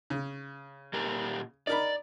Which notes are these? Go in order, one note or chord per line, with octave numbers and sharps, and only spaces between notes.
C#3
A#2 G4 A#4
D#4 A#4 D5 B5